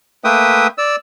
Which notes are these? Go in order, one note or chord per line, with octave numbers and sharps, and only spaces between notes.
A3 A#3 B4 E5 G5 D#6
D5 E6